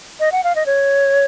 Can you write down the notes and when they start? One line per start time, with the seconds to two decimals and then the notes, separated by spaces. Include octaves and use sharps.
0.20 D#5
0.32 F#5
0.44 F5
0.56 D#5
0.66 C#5